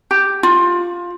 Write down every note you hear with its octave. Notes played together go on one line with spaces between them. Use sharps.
G4
F4